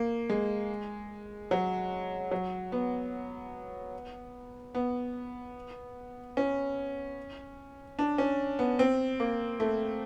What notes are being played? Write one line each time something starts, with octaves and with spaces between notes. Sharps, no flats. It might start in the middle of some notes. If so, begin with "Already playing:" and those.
Already playing: A#3
G#3
F#3
F#3
B3
B3
C#4
D4
C#4
B3
C4
A#3
A3